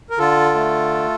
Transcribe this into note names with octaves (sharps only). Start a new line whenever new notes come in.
A#4
D3 F4 A4
A3